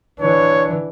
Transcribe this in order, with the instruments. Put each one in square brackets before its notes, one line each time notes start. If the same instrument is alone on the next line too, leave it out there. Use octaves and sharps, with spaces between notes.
[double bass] E3 D4 [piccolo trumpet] C#5